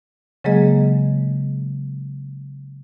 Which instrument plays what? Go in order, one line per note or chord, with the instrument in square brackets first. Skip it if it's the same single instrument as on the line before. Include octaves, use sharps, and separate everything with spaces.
[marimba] C#3 F#3 G#3 A#3 G#4 D#5